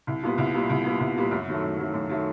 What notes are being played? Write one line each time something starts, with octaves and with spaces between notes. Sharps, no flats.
C2
A#2 G3 B3
C2
A#2 G3 B3
C2
A#2 G3 B3
C2
A#2 G3 B3
F#2
D#3 F#3 A3
F#2
D#3 F#3 A3
F#2
D#3 F#3 A3